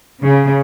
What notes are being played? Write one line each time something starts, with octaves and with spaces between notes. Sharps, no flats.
C#3